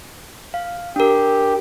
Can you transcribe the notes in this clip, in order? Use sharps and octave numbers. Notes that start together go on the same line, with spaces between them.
F5
D4 G4 A#4